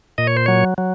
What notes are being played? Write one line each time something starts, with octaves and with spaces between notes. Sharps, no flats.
A#2 D#5
C#5
C5
F#3 C#5
F#3